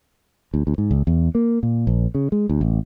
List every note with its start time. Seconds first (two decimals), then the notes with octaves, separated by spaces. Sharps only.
0.54 D2
0.67 D2
0.78 G#2
0.91 C#2
1.07 E2
1.35 A#3
1.63 A#2
1.87 A#1
2.15 C#3
2.32 G#3
2.49 D2
2.61 A1